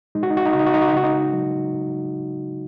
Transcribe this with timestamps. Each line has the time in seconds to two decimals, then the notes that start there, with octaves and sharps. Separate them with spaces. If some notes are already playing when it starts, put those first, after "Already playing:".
0.15 G#3 D#4
0.23 F#4
0.30 D#4
0.37 F#4
0.45 D#4
0.53 C#3 F#4
0.59 D#4
0.66 F#4
0.74 D#4
0.82 F#4
0.88 D#4
0.93 C#3 F#4
1.04 D#4
1.33 F#3